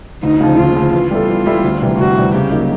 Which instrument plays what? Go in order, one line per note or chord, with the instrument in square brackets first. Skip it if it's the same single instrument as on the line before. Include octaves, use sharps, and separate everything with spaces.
[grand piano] D2 [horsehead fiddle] D#4
[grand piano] C#3 F3
[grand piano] D2 [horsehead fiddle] F4
[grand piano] C#3 F3
[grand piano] E3 [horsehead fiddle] F4
[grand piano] G3 B3 E4 A4
E3
G3 B3 E4 A4
D2
C3 E3 G3
[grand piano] D2 [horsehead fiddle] F#4
[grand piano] C3 E3 G3
[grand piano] C#3 [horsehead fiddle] G4
[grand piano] F#3 A#3 D#4